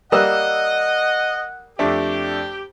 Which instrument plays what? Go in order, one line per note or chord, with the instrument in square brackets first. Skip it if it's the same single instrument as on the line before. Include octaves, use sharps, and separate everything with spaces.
[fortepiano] G3 A#3 [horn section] D#5 [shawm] F#5 [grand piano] D#6 E6 F#6
[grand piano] F2 A3 D4 [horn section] G4